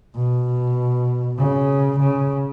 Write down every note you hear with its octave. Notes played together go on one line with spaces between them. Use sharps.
B2
C#3
C#3